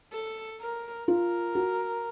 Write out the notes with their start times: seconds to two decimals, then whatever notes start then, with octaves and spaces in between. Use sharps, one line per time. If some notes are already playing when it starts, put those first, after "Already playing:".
0.13 A4
0.60 A#4
1.07 F4 A#4
1.55 F#4